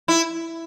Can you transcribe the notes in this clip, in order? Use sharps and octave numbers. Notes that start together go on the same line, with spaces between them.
E4